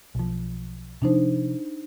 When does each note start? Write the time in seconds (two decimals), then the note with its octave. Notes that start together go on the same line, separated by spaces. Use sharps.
0.15 B1 F3
1.02 C3 F3 D4 D#4 C5